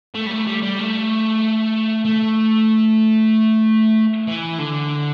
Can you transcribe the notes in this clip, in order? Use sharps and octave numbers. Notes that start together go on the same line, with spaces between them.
A3
G3
A3
G3
G3
A3
A3
E3
D3